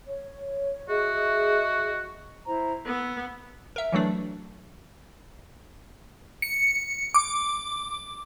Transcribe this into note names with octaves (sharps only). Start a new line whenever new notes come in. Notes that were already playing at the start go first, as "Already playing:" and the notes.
C#5
F#4 G#4 D#5 E5
E4 C5 A#5
B3 E6
A#4 E5
E3 F#3 A3 D4
C#7
D6